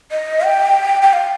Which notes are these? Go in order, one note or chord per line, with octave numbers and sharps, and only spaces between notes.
D#5
G5
G5
F5